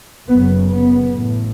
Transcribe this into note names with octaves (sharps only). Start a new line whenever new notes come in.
F#1 F#2 C#3 B3
B3
A1 A2